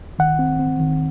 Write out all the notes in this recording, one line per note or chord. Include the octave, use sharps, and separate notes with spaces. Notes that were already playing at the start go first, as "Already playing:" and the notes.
D#3 F#5
C4
C4
D#3